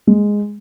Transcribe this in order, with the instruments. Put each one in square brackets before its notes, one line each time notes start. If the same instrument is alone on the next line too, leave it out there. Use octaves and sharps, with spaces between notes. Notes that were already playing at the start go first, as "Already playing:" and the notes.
[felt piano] G#3